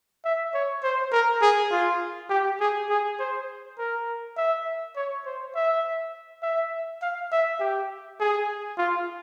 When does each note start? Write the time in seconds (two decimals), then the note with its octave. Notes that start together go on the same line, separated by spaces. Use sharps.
0.25 E5
0.54 C#5
0.83 C5
1.12 A#4
1.42 G#4
1.72 F4
2.30 G4
2.61 G#4
2.90 G#4
3.20 C5
3.78 A#4
4.37 E5
4.96 C#5
5.26 C5
5.55 E5
6.42 E5
7.02 F5
7.32 E5
7.60 G4
8.20 G#4
8.78 F4